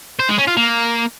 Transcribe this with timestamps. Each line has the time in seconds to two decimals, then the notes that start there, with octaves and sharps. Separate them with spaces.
0.19 C5
0.29 G#3
0.38 C#4
0.48 F4
0.57 A#3